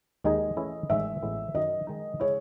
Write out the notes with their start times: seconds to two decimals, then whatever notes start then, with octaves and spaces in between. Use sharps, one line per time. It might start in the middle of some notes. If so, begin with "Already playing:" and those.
0.24 D#2 D#3 G#3 D#4 G#4 D#5
0.57 E3 A3 C#4 E4 G#4
0.90 A1 G#2 D#3 G#3 C#4 E5
1.23 A1 A2 G#3 B3
1.55 F#2 D#3 F#3 D#5
1.87 D#3 G#3 D#4
2.20 C#3 G#3 C#4 E4 C#5